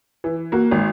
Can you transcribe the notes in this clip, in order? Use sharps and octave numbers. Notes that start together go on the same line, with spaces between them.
E3
A#3 F#4
G#1